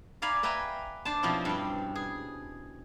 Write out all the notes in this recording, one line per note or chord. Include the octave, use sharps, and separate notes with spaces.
D5 F5 G#5 A#5 B5
B4 E5 G5 G#5 A#5
D4 C5 A5
B2 F3 C4 C#4 E4
G2 G5
G#4